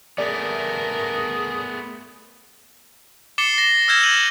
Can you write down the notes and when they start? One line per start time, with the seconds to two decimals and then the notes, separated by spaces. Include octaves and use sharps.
0.18 A3 B3 G#4 A#4 D5
3.38 D6 A6 C7 C#7 E7 G7
3.56 A6 A#6 G7
3.88 E6 F6 G6 G#6 A#6 E7
4.03 G6 G#6 D#7 F#7